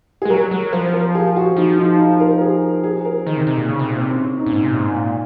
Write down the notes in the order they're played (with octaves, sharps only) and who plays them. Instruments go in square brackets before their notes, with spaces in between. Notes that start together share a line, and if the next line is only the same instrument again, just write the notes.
[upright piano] G#4
[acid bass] G#3
[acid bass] F#3 [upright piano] A#4
[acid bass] F#3
[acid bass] F3 [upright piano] C5
[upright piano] A#4
G#4
F#4
[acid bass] F3 [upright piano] D#4
[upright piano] D#4
D#4
A#4
A#4
G#4
G#4
A#4
[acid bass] D#3 [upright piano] D#4
[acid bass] C3
C3
A#2
C#3
C3
A#2
[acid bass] C3 [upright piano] C4
[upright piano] C#4
C#4
D#4
[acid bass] A#2
G#2
C3
A#2
G#2
A#2